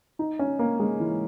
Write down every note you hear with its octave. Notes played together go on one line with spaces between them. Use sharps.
D#4
C#4
A#3
G#3
E3